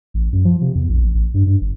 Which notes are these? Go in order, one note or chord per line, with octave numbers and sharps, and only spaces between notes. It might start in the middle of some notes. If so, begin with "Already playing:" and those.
A1
F#2
F3
C3
E2
A#1
A1
A1
G2
G2
G1